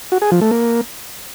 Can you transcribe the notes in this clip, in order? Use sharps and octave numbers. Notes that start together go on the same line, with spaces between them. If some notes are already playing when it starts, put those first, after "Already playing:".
F#4
G#4
F3
A3
A#3